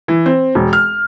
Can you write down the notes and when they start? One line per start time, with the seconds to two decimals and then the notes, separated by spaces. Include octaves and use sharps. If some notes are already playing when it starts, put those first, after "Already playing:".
0.08 E3
0.26 C4
0.55 E1
0.73 F6